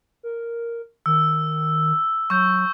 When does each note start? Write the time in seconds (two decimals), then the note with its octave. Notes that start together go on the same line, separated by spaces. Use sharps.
0.23 A#4
1.06 D#3 E6
2.30 F#3 C#6 E6 G6